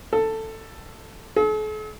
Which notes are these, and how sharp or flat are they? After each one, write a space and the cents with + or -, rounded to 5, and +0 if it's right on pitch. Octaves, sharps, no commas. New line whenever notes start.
A4 +10
A4 -45